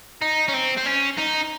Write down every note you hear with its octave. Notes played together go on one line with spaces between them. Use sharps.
D#4
C#4
C4
C4
C#4
D#4